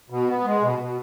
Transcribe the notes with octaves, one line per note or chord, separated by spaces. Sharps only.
B2
B3
G#3
B2
B2